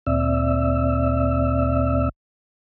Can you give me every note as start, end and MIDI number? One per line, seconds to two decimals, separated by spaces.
0.07 2.09 38
0.07 2.09 46
0.07 2.09 60
0.07 2.09 74
0.07 2.09 76
0.07 2.09 88